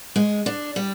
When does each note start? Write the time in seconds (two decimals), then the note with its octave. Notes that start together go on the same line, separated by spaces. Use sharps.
0.16 G#3
0.46 D4
0.76 G3